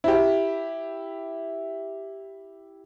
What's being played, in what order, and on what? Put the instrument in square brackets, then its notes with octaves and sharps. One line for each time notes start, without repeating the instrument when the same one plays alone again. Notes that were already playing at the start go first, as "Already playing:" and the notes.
[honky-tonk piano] E4 G4